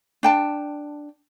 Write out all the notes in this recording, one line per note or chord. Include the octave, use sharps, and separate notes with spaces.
D4 G5 A5